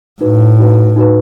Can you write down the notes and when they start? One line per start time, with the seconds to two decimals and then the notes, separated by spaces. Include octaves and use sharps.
0.21 A2 D#4 F#4 B4
0.59 D#4 F#4 B4
0.96 D#4 F#4 B4